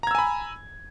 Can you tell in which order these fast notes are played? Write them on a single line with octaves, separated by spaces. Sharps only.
A#5 G#6 E6 G#5 B5